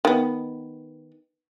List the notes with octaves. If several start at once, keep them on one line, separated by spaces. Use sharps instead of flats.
D#3 B3